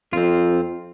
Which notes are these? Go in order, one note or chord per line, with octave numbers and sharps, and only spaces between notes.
F2 C4 F4